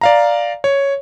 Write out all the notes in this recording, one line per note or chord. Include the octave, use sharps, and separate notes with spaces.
D5 F5 A#5
C#5